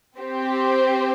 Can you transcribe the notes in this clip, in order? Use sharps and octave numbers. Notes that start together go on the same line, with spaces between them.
C4 G4 C5